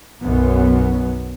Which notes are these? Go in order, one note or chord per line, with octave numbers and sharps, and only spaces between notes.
B1 F#2 F#3 B3